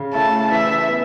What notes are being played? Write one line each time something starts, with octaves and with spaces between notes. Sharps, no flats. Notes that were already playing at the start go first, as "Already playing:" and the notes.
Already playing: C#3
A3 E4 A5
E3 E5
B3